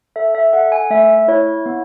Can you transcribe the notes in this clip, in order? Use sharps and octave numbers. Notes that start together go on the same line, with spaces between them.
A4 E5
E5
A4 F#5
G#5
A3 E5
E4 C#5
B3